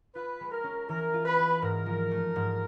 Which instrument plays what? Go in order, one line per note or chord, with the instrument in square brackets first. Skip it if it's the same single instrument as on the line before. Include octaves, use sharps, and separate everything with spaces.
[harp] F4 [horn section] B4
[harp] G#3
[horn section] A#4
[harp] C#4
[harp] E3 [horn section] A#4
[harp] F4
[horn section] B4
[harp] G#3
[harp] G#2 [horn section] A#4
[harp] F3
A3
G#2